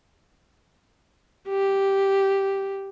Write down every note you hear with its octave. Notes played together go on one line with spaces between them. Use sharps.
G4